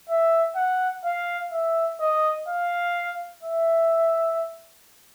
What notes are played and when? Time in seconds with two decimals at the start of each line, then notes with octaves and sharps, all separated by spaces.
0.09 E5
0.56 F#5
1.05 F5
1.52 E5
2.00 D#5
2.48 F5
3.43 E5